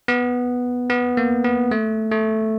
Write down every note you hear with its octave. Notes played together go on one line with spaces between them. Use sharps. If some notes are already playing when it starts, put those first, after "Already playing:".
B3
B3
A#3
B3
A3
A3